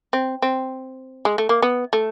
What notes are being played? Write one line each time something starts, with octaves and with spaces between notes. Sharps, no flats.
C4
C4
G#3
A3
A#3
B3
A3